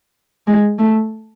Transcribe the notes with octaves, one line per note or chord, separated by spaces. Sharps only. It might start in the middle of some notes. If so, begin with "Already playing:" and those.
G#3
A3